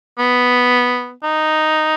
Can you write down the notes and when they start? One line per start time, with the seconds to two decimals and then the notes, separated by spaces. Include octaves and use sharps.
0.19 B3
1.24 D#4